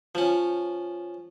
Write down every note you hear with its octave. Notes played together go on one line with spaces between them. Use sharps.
F3 C#4